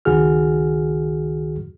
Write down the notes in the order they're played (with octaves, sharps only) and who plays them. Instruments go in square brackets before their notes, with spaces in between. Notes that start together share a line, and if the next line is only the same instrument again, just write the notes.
[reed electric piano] C#2 D#3 F#4 G#4 F6